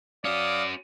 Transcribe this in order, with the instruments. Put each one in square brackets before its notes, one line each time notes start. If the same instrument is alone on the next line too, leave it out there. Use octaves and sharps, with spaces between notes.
[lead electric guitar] C#4 F#4 [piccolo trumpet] D5 [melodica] F5 D#6